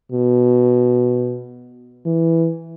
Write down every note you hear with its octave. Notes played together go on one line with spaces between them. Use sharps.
B2
E3